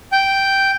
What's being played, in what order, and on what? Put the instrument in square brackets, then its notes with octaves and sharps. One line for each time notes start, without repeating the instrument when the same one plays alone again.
[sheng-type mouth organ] G5